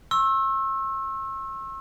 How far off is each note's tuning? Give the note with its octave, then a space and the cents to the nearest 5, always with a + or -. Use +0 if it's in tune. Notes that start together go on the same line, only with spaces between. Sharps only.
C#6 -45 E6 +0